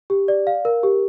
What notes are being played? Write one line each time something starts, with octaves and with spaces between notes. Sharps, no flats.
G4
D5
F5
A#4
G4